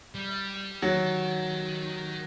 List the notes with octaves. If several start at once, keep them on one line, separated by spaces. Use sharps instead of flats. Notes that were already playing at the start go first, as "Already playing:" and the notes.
G3
D#3 F#3